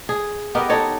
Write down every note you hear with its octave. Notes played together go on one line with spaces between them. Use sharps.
G#4
B3 G4 A#4 D#5
D#4 A4 C#5 D#5